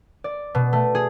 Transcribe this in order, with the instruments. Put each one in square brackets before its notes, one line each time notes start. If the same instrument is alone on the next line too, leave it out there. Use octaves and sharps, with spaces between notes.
[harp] D5
B2
A3
G#4